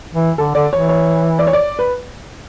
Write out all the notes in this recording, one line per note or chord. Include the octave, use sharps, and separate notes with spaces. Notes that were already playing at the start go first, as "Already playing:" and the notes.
E3
D3 A4
D3 D5
E3 C#5
C#5
D5
C#5
D5
B4